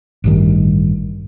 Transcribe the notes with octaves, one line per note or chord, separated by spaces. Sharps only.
A1 G2 D#3